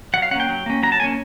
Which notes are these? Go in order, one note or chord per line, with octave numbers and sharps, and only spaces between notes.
F#3 F#5
F5
A#3 C#4 F#5 G5
F#3
A#3 C#4
F#3 A#5
A5
A#3 C#4 G#5